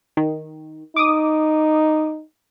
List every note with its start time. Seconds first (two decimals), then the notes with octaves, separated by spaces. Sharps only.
0.17 D#3
0.96 D#4 D6 D#6